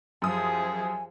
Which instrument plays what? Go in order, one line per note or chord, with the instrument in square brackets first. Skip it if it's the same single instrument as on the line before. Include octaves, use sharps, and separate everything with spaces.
[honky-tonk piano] F#2 D#6 [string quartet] F3 G4 G#4 [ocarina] G#5